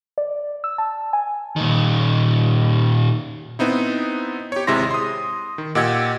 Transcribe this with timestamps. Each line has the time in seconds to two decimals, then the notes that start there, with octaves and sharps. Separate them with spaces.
0.18 D5
0.64 E6
0.78 A5
1.13 G#5
1.56 A#2 D#3
3.59 B3 C4 D#4 E4
4.52 G4 C#5
4.67 G#1 C3 G#3 E4 C6 A#6
4.91 C6 D#6
5.58 D#3
5.75 A#2 G4 D#5 F#5 E6 G#6